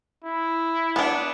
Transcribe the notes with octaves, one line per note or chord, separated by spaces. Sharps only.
E4
B3 D4